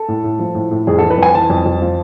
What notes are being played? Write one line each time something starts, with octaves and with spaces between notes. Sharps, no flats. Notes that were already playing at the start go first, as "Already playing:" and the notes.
Already playing: A4
A2
A2
F3
A2
A2
F2 G#4
E3 A4
B4
F2 G#5
E3 A5
F2
F2
F3